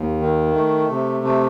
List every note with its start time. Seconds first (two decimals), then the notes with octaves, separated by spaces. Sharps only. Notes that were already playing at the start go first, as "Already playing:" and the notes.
Already playing: D#2
0.21 D#3
0.55 A3
0.89 C3
1.24 A3